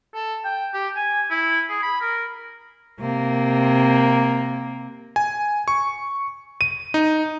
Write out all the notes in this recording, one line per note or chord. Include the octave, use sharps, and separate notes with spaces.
A4
G5
G4
G#5
E4
G#4
B5
A#4
C3 A#3
G#5
C#6
D#7
D#4